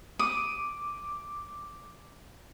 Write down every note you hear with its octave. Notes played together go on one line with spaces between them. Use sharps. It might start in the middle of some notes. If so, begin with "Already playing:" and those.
D6 D#6